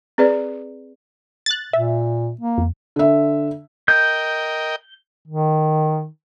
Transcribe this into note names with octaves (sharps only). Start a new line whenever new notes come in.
C4 G#4 B4 D5
F#6 A6
A#2 E5
A#3
F2
D3 E5
A#4 D#5 G5 G6
D#3